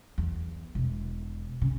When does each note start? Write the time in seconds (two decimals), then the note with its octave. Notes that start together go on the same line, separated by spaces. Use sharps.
0.18 E2
0.75 E1
1.61 C#3